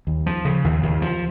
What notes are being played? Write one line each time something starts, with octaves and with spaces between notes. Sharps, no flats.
D#2
F3
C#3
D#2
D#2
F3